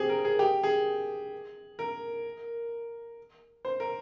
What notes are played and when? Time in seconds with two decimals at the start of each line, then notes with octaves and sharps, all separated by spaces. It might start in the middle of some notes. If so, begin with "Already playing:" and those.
Already playing: C4 G4 G#4
0.09 A#4
0.25 G#4
0.39 G4
0.63 G#4
1.79 A#4
3.65 C5
3.80 A#4